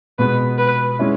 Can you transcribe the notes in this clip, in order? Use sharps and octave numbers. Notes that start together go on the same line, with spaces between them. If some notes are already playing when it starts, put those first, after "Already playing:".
B2 G#3 B3 B4
B4
G#3 C#4 E4